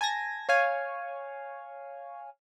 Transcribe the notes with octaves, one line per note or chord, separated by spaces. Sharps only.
G#5 A5 G#6 A#6
C#5 F5 G#5